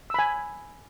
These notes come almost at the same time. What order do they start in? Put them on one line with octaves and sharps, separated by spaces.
E6 B5 G#5